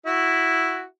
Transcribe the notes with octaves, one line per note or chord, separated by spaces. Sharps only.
E4 F#4